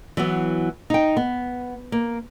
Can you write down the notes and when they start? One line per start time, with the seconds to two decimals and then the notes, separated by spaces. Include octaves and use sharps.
0.17 E3 F#3 B3
0.90 D#4 G5
1.17 B3
1.92 A#3